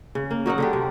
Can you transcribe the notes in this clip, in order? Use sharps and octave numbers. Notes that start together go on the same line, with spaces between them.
C#3
A#3
F#3 D#4 A#4 F#5
D3 D4 G4
C3